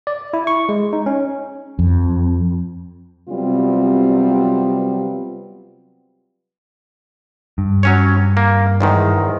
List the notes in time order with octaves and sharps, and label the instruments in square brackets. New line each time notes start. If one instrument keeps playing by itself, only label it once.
[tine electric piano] D5
E4
C#6
G#3
D#4
C#4
[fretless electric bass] F2
[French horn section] C3 F#3 G3 B3 C4 F4
[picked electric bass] G2
[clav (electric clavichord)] F#3 C#4 C#5
A#3
E2 G#2 D#3